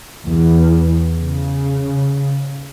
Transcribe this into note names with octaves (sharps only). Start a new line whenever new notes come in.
E2
C#3